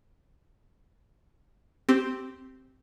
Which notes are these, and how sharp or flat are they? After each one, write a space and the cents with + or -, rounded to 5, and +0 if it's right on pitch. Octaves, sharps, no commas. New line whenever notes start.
C4 +0 G4 -15